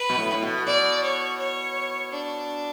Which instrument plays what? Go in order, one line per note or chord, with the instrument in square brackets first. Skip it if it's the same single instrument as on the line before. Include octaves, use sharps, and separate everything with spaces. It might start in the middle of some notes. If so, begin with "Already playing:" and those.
Already playing: [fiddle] B4
[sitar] B2
A2
A2
B2
[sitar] B2 [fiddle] D5
[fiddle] C#5
C#5
D4